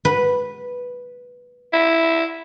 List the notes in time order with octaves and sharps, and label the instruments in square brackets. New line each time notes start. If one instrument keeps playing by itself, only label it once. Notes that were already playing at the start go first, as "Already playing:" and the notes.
[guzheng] B4
[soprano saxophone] E4